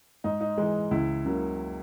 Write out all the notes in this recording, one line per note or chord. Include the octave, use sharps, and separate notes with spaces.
G#2 D#4
D#4
E3 G#3
C#2 E4
C#3 F#3 A#3